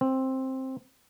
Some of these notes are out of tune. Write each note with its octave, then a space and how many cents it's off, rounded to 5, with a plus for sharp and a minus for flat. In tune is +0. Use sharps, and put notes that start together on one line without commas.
C4 +10